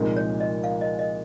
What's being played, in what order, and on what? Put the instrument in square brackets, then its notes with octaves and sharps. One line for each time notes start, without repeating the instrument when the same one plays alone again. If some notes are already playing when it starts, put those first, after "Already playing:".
Already playing: [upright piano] C2 A#2 F3 G#3 D#4
[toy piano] C#5
D#5
F5
D#5
D#5